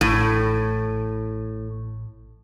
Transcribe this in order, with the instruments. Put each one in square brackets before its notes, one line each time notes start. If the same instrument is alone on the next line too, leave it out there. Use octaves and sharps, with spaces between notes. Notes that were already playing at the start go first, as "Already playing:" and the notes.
[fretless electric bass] A1 [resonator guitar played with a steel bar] A2